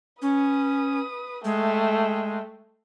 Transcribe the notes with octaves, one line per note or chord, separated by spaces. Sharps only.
C#4 B4 D#6
G#3 A3 G5